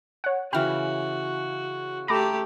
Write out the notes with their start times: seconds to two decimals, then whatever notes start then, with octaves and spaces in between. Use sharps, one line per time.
0.24 C#5 F#5
0.53 C#3 E3 F#4 G5 B5 F6
2.08 A3 G4 A#5 B5 D6